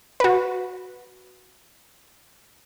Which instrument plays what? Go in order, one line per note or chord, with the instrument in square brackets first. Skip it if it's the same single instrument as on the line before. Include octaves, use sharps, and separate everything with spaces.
[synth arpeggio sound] F#4 B4